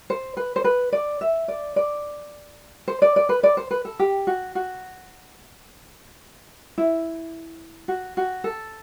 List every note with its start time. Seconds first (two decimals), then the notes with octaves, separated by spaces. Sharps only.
0.10 C5
0.37 B4
0.56 C5
0.64 B4
0.92 D5
1.21 E5
1.48 D5
1.76 D5
2.88 C5
3.02 D5
3.16 D5
3.29 B4
3.43 D5
3.57 C5
3.71 B4
3.85 A4
3.99 G4
4.27 F#4
4.55 F#4
6.78 E4
7.88 F#4
8.17 F#4
8.44 A4